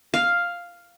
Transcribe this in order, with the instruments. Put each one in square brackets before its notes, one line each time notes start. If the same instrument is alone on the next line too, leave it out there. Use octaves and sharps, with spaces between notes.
[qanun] F5